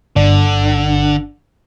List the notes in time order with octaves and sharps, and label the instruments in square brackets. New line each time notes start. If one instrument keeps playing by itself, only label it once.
[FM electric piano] G1 D4 [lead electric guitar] D3